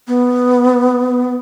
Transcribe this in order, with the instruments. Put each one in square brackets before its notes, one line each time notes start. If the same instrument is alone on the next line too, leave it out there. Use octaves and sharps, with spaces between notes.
[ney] B3